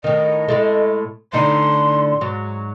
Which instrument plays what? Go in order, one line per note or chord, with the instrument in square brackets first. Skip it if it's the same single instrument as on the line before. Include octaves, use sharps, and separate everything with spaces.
[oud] A2 D#3 [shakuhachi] D#5
[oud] A2 G#3 A3
[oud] A2 D3 D#4 [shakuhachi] C6
[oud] G#2 F#3